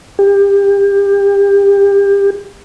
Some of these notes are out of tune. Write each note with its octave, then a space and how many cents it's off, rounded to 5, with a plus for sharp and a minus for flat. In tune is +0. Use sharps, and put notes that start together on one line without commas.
G4 +30